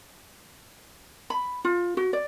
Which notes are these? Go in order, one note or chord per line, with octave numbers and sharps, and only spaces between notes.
B5
F4
F#4
D5